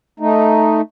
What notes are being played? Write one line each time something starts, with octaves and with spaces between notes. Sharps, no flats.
A3 D#4